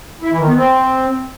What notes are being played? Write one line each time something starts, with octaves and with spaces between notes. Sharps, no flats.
E4
E3
D#3
B3
C4